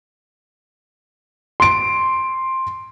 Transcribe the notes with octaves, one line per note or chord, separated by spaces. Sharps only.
C6 D7